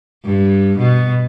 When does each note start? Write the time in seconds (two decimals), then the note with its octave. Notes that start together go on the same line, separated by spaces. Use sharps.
0.24 G2
0.78 B2